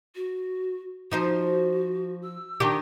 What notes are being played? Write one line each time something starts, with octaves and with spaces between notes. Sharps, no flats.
F#4
F3 D#4 F#4 C5
E6
D#3 D4 G4